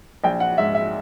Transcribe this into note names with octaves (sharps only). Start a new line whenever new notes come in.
A#1 G5
F#5
G#2 E5
E5